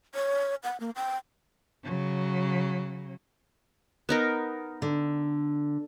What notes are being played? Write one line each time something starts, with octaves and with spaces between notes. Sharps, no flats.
C#5
F#5
A#3
G5
C#3 F#3
B3 D#4 A#4
D3